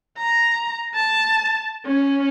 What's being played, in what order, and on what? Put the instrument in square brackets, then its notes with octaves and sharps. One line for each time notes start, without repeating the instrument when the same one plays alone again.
[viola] A#5
A5
C#4